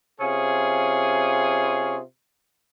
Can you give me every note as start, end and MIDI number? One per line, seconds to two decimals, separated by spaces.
0.21 1.99 48
0.21 1.99 61
0.21 1.99 65
0.21 1.99 68